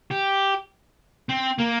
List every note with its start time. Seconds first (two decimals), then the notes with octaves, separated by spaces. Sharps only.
0.11 G4
1.30 C4
1.60 A#3